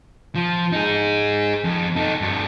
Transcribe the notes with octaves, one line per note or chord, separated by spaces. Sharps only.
F3
D#4 G#4
F2
D#4 A4
G2 F#4